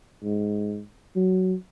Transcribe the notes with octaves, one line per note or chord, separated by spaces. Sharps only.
G#2
F#3